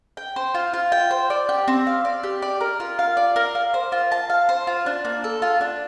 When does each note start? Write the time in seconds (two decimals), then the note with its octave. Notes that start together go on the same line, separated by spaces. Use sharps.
0.17 G5
0.36 C5
0.54 F4
0.74 F4
0.92 G5
1.11 C5
1.30 D5
1.49 G4
1.68 C4
1.87 F5
2.05 D5
2.23 G4
2.42 D5
2.61 A#4
2.80 F4
2.99 F5
3.17 D5
3.36 A#4
3.55 F5
3.74 C5
3.92 F4
4.12 A5
4.30 F5
4.49 C5
4.67 F4
4.86 D4
5.05 A#3
5.24 A4
5.42 F4
5.61 D4